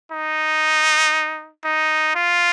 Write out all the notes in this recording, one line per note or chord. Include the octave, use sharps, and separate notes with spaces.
D#4
D#4
F4